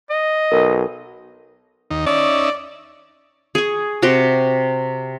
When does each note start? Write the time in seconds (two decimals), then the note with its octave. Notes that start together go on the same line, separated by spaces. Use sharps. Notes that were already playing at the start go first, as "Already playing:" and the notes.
0.10 D#5
0.52 B1 A#4
1.91 D#2 D#4
2.07 C#4 D#4 D5 E5
3.55 G#4 C#6
4.02 C3 F#4 G4 C6